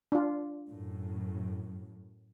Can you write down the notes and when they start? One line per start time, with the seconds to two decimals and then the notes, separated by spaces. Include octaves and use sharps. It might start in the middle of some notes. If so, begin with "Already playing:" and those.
0.12 D4 F4
0.71 F#2 A2